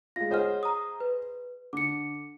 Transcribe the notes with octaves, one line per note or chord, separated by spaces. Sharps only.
G#3 F4 A#6
G#4 C5 C#5 D#5 F#5 F6
A#5 D#6
B4
D3 D6 C#7